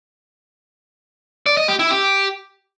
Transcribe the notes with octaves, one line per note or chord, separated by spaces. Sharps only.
D5
D#5
G4
E4
G4